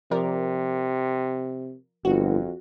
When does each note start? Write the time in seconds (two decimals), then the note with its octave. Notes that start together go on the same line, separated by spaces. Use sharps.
0.11 C3 F3 A#4 D5
2.05 G1 F2 F#4